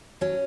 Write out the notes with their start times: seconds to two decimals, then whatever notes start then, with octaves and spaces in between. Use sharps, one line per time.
0.21 F#3 C#4